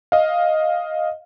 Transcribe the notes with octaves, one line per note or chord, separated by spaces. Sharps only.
D#5 F5